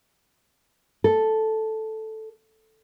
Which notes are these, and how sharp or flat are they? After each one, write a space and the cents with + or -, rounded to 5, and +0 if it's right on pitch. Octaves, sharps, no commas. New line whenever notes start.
A4 -5